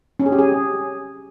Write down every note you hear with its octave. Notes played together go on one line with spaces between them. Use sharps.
C#4
G#4
G4
G#4